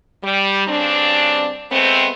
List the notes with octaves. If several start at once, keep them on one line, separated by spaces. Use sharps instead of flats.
G3
G2 C#3 C4 D4
G#3 A3 B3 C4